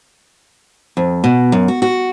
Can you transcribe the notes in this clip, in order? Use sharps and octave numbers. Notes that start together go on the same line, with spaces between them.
F2
B2
F#2
F#4
F#4